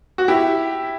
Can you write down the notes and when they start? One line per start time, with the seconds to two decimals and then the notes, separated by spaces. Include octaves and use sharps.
0.18 F#4
0.28 E4 G4